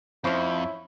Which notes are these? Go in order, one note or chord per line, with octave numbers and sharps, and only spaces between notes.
F2 F3 C#4 E4 C5 B5 C#6